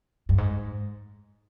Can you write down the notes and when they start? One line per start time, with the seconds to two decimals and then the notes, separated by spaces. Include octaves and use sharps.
0.29 G2
0.38 G#2